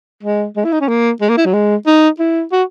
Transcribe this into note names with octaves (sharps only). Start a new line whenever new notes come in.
G#3
G#3
E4
D#4
C#4
A#3
G#3
A#3
E4
F#3
G#3
D#4
E4
F#4